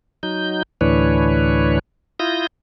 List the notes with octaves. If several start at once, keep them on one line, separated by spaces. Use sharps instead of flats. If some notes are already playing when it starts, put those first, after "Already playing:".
F#3 D#4 G6
D2 A2 E3 D4 B4 C#5
E4 F4 D#6 G6 A#6